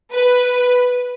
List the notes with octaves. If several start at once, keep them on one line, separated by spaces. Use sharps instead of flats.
B4